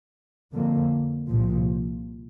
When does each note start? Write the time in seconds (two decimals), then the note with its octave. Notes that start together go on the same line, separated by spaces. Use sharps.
0.52 F2 D3 A#3
1.28 C2 A#2 F3